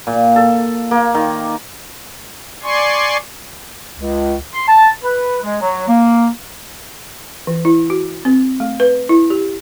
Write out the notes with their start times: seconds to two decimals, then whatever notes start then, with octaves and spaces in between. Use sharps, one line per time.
0.07 A#2
0.36 A4
0.91 A#3
1.15 D#3
2.63 D5 G#5 C6 C#6
3.99 C#2
4.53 C6
4.67 A5
5.03 B4
5.42 G#3
5.60 F#3
5.87 A#3
7.47 E3
7.65 E4
7.90 F#4
8.25 C4
8.60 A3
8.80 B4
9.09 E4
9.30 G4